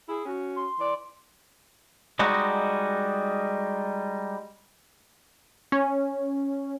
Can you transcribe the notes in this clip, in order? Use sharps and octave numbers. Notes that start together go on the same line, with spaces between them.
E4 G#4
C#4 F#4
C6
E3 D5
G3 G#3 D#4 F#4
C#4